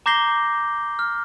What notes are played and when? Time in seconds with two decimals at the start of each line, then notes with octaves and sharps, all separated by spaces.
0.06 A#5 D6 G6 A#6 C7 G7
0.99 F6